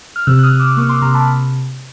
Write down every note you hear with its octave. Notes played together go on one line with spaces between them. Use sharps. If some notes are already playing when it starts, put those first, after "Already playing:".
F6
C3 E6 F#6
F#6
D#6 F6
C3
D6 E6
A#3 C#6 D#6
C6 D6
C3 A#5 C6
A5 B5